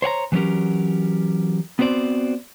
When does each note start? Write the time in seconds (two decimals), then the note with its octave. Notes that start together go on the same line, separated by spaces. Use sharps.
0.02 C5 C#5 F#5 A#5
0.32 E3 F#3 B3 C#4 G4 A#4
1.79 B3 C4 F#4 C5 D5